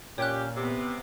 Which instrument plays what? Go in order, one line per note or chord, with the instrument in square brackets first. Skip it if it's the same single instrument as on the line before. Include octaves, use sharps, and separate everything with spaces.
[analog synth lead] A#2 [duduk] C#4 [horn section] G4 [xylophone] C#5 G5 F#6
[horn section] C3 [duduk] B3